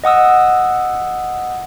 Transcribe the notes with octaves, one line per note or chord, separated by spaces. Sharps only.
D#5 F#5 D#6 E6